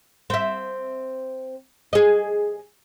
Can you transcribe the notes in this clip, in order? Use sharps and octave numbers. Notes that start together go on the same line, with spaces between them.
C4 E5
G#4 D#5